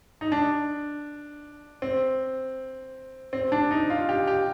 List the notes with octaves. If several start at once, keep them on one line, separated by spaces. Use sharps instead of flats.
D#4
D4
C4
C4
D4
D#4
F4
G4
G4